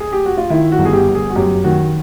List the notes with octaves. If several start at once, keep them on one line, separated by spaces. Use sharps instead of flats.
G#4
G4
F#4
F4
D#3 E4
F#4
G1
G#4
G4
G1
G#4
F#4
F#2 G4
D#3 F#4